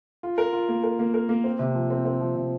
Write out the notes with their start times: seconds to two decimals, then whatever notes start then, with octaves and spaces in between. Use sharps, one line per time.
0.23 F4
0.38 A#4
0.53 F4
0.68 A#3
0.83 A#4
0.99 A#3
1.14 A#4
1.29 A#3
1.44 C4
1.59 C3
1.75 F3
1.90 C4
2.05 C4
2.21 F3
2.35 C3